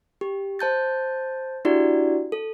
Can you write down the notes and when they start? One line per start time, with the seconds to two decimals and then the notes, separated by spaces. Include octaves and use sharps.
0.21 G4
0.59 C5 A5 G6 A6
1.65 D4 E4 F#4 G4 D5
2.32 A4